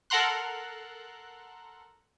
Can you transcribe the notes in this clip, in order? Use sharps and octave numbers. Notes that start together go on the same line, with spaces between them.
A4 A#4 F#5 A#5 C6 F#6